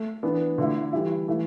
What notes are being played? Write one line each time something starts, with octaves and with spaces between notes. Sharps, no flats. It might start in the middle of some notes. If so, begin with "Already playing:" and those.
Already playing: A3
E3 B3 D4
D3 A3 E4
E3 G3 E4
E3 A3 E4